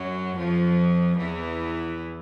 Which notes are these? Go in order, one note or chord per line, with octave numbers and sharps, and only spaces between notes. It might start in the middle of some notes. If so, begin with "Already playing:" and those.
Already playing: F#2 F#3
F2 F3
E2 E3